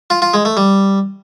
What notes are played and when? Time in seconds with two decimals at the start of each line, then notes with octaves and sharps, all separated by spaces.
0.10 F4
0.22 F4
0.34 G#3
0.45 A3
0.57 G3